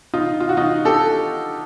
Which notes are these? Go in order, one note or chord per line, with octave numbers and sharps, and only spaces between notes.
D#4 F4
F4
F#4
D#4 F4
G4 A4